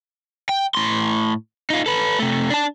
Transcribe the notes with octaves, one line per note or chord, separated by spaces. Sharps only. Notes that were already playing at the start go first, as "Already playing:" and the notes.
G5
A2 C6
D#4 F4
A4 B4
C3 A3
D4 A5